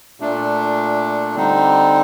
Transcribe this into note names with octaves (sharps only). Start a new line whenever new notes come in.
A#2 A3 D4
D3 G3 C4 D#4